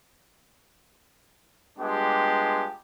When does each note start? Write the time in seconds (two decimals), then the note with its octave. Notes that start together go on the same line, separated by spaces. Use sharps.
1.79 G3 G#3 B3 D4 F4 G4